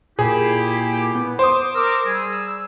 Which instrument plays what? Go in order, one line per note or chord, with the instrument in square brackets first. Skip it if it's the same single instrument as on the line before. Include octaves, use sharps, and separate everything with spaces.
[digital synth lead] A#2 [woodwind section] E4 G4 [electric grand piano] G#4
[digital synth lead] B3
[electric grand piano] C5 D#6 [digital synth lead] D6
[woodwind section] A#4 D6 [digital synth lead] E6
[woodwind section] G3 G#4